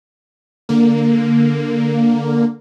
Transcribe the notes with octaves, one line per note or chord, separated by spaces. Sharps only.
D3 A#3